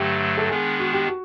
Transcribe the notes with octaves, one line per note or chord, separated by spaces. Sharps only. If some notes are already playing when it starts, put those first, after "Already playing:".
Already playing: G2 D3 F#3 A3 G4
A4
D#3 G#3 B3 D4 G#4
F#4
G4
F#4